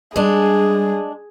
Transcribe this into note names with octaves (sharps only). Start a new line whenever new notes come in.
G3 G#3 D4 G#4